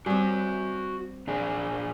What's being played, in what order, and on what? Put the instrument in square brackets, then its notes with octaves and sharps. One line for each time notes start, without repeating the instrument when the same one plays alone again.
[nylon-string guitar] G3 C4 [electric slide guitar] F#4 G#5
[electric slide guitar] A#2 D4 G#4